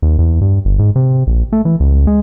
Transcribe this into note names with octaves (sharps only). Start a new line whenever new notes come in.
D#2
E2
G2
G1
G#2
C3
A#1
A3
E3
C#2
G#3